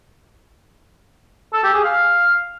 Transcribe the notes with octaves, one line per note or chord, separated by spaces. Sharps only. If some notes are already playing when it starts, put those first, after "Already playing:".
A4
G4
G#4
F5